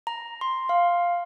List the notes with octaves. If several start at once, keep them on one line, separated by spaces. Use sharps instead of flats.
A#5
C6
F5